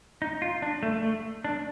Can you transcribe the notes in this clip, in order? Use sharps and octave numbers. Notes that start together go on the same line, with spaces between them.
D#4
F4
D4
A3
A3
D4